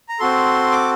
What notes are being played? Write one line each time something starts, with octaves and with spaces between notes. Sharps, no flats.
A#5
C4 F#4 A4 C6
D6